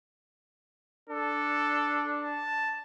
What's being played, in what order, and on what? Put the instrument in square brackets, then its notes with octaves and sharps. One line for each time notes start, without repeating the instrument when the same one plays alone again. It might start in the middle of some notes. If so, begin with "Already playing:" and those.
[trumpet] D4 [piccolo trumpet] A4
[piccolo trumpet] A5